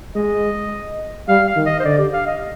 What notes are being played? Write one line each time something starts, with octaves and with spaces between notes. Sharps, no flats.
G#3 D#5
G3 F5
F5
D#3
D#5
C5
D3 D5
G4
F5
D#5